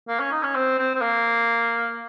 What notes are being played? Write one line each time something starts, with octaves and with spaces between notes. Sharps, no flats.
A#3
C#4
D#4
C#4
C4
C4
C4
A#3